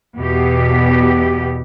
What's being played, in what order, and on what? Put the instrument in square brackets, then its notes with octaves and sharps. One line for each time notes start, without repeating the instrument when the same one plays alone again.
[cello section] E2 B2 B3 G4